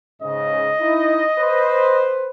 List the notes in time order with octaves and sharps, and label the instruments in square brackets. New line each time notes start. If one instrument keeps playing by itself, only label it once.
[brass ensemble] G#2 C#3 [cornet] D#5
[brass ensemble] D#4 E4
B4 C5